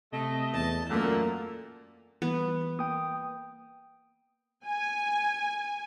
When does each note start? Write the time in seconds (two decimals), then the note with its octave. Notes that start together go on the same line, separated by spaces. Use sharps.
0.13 C3 A3 D#5
0.54 E2 A5
0.90 F#2 A#2 D3 A3 A#3 A4
2.22 E3 G3 B3
2.79 A#3 G5 D#6
4.66 G#5